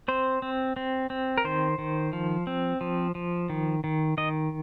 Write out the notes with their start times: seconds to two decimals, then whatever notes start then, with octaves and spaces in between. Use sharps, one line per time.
0.08 C4 C5
0.42 C4
0.76 C4
1.10 C4
1.38 A#4
1.45 D#3 C5
1.78 D#3
2.13 F3
2.47 C4
2.81 F3
3.15 F3
3.50 D#3
3.84 D#3
4.17 D#3 D#5